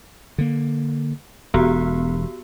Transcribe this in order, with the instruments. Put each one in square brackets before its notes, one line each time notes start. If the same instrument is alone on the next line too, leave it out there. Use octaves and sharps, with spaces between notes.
[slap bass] D3 A#3
[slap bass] E1 [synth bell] B3 F#4 G4